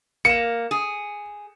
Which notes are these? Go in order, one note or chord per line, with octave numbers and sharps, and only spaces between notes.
A#3 C#7 E7
G#4